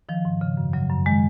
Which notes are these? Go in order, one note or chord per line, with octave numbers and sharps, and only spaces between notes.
D#3 F3
G#2
C#3
F#2
C#3 F#3
F#2
D#3 G#3